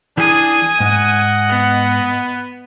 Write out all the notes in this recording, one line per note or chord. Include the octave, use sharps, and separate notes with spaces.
E3 D4 G#4 G#5 D#6
G#2 D#5 F#5
B3